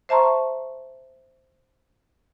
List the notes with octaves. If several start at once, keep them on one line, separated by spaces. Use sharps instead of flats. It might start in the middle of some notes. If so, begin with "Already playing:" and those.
C5 E5 A5 A#5 C6 C#6